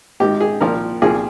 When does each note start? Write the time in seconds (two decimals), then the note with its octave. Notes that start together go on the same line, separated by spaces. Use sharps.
0.20 G#1 G#2 D#3 G4
0.40 G#4
0.60 C2 A#2 F3 A#4
1.02 C2 A#2 F3 G#4